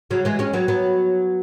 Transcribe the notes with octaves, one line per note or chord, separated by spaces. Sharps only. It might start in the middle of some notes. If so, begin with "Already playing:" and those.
C#3 F#3
E3 G#3
G#3 C#4
F#3 B3
F#3 B3